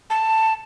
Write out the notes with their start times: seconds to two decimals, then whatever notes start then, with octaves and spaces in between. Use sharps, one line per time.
0.10 A5